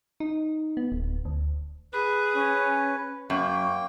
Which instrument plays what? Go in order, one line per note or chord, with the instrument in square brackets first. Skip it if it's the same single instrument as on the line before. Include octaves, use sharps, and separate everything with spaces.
[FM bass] D#4
B3
D1
D2
[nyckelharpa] G#4 [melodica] B4
[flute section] C#4
[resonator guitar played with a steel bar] F#2 [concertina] A#3 G5 [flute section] C#6